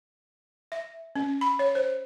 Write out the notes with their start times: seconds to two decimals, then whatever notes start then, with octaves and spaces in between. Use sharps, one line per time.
0.72 E5
1.16 C#4
1.41 B5
1.59 C#5
1.75 C5